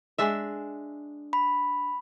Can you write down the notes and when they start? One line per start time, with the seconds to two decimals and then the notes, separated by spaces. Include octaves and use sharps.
0.18 G#3 D4 E5
1.33 B5